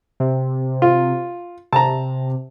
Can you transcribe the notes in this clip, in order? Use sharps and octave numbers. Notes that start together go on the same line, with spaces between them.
C3
F4
C3 A5 A#5